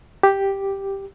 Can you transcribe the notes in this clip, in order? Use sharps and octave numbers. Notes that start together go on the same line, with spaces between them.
G4